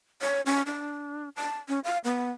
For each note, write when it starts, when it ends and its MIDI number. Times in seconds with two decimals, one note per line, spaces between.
0.22 0.41 73
0.46 0.62 61
0.66 1.29 62
1.36 1.56 81
1.69 1.80 61
1.84 1.98 77
2.04 2.30 59